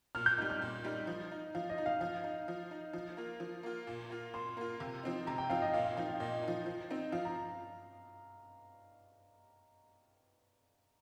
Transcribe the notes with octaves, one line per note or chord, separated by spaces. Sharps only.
A#2 F6
G6
G3 D#4 F6
F6
A#2 F6
G3 D#4
F3
D#4
F3 F5
D#5
D#4
F5
F3 F5
D#4
F3
D#4
F3
A#3 F4
F3
A#3 F4
A#2
A#3 F4
A#2 C6
A#3 F4
C3
F3 C4 D#4
C3 A#5
G5
F3 C4 D#4 F5
D#5
A#2 F5
F5
F3 D#4 G5
F5
A#2 D#5
F3 D#4
F3
C4 D#4
F3 F5
A#5